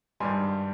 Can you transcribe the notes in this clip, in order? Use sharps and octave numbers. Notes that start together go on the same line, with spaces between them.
G#1 G2 G3 G#5 C6